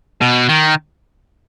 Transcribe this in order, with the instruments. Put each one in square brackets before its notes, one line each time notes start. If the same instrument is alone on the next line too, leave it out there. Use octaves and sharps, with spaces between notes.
[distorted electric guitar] B2
D#3